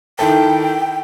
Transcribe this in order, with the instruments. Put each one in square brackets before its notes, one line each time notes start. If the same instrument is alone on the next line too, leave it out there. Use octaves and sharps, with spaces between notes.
[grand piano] D#3 E4 A4 [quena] G5